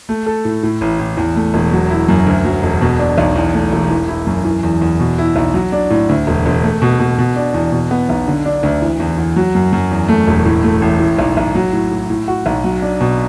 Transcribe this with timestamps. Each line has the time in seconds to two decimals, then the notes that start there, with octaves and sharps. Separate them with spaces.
0.09 A3
0.26 A4
0.45 A2
0.63 A2
0.81 A1
0.99 A1
1.17 E2
1.36 A3
1.54 E1
1.72 F#3
1.90 E4
2.09 F#2
2.27 D2
2.45 F#3
2.63 E1
2.81 B2
2.99 D4
3.18 B1
3.36 E2
3.54 A3
3.72 E1
3.90 E3
4.08 E4
4.27 F#2
4.45 E3
4.63 E2
4.81 E2
5.00 B2
5.18 E4
5.36 B1
5.54 F#3
5.72 D4
5.90 A2
6.09 D2
6.27 E1
6.46 E1
6.64 A3
6.82 B2
6.99 B2
7.18 B2
7.36 D4
7.54 E2
7.72 B2
7.91 B3
8.09 B1
8.28 D3
8.46 D4
8.63 D2
8.82 E3
9.00 E2
9.18 E2
9.36 F#3
9.55 F#2
9.73 F#2
9.91 E2
10.09 A3
10.27 E1
10.45 A2
10.63 A3
10.82 A1
11.00 A2
11.19 B1
11.37 B1
11.55 F#3
11.73 A2
11.91 A2
12.10 A2
12.28 F#4
12.46 B1
12.64 F#3
12.82 D4
13.01 B2